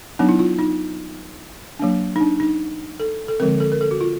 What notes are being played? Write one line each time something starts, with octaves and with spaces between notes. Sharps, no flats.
F#3 B3 D4 D#4
E4
F4
D#4
F#3 A#3 D4
D#4
D4
D#4
A4
A4
D3 F3 G#3 C4 A#4
A4
A#4
A4
F#4
F4